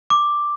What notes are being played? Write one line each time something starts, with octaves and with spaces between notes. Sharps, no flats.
D6